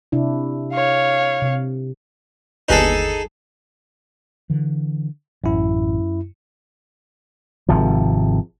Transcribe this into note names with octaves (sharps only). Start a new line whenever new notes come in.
C3 D4 E4
C#5 F5
C3
G1 D#2 D#4 G#4 A4 B4
D3 E3
A1 F#2 E4
G#1 C3 F3